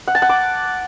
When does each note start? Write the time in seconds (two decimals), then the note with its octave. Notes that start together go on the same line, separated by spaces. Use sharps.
0.08 F#5
0.15 A5
0.22 F#5
0.29 D6